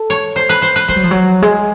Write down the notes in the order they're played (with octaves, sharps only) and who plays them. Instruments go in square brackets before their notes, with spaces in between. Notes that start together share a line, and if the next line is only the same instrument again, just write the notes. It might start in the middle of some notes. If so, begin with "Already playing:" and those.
Already playing: [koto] A4
C#5
C5
B4
C5
B4
[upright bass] G3 [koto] C5
[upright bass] F#3
F3
F#3
G#3